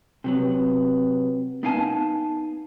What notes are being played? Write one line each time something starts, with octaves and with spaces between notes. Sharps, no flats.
C3 F#3 B3
B3 D#4 F5 G#5 A5